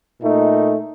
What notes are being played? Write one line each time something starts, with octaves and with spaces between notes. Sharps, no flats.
A#2 A3 D#4